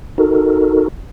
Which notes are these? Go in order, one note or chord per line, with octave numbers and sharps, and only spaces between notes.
D#4 F#4 A4 A#4